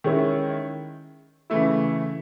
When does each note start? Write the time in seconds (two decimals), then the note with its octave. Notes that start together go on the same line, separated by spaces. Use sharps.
0.04 D#3 G#3 C#4 E4
1.50 C#3 E3 A3 E4